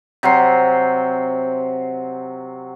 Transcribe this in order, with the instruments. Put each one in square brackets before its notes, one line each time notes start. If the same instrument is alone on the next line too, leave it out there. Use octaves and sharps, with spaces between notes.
[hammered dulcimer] C3 F#3 G5 C6